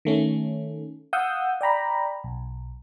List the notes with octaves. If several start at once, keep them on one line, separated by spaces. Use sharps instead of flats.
D#3 A3 C#4
F5 F#5 D#6 E6 G6
D5 G5 A#5 B5
B1